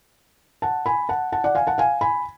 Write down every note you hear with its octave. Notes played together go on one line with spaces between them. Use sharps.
F#5 A5
G#5 B5
F#5 A5
F#5 A5
D5 F#5
F5 G#5
F#5 A5
F5 G#5
G#5 B5